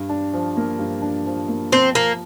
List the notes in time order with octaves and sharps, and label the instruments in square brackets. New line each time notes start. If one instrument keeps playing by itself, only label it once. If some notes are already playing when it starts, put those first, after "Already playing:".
Already playing: [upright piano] G2
D4
F3
A#3
G2
D4
F3
A#3
[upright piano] F3 [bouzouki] C4
[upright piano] F3 [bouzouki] A#3